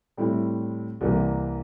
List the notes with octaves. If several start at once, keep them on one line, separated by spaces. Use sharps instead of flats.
A2 G3 C4 E4
C2 C3 E3 A#3